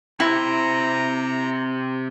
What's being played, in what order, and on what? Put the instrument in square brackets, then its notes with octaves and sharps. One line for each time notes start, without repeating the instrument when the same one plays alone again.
[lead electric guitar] C3 C5 [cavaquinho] E4 [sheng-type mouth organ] A#5